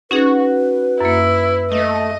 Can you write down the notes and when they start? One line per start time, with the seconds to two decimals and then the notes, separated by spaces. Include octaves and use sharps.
0.11 C#4 D#4 F#4 G#4 B4
1.00 F#2 A#3 E4
1.72 A3 D#5